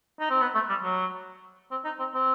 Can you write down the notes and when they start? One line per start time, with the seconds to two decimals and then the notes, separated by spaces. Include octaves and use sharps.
0.20 D#4
0.30 C4
0.41 B3
0.55 A3
0.69 G3
0.83 F#3
1.71 C4
1.85 D#4
1.99 C4
2.14 C4